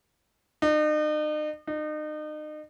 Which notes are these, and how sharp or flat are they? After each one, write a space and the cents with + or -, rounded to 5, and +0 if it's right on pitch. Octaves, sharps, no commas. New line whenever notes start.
D#4 -40
D#4 -35